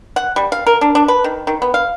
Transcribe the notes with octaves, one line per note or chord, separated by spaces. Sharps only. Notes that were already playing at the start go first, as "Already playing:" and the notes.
F#5
G3
F5
A#4
D4
D4
B4
D#3
D#3
B3
F5